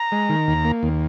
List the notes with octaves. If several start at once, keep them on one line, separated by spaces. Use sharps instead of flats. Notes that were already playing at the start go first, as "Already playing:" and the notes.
Already playing: A#5
G#3
D#3
D#2
A#3
D#2